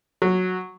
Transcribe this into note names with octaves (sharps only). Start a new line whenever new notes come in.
F#3